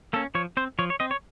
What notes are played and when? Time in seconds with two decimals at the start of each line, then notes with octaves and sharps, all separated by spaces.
0.13 A#3 C#4 A4
0.35 F3 C#5
0.57 C4 C5
0.79 F3 C#5
0.90 C#5
1.00 C4 D#5
1.11 C#5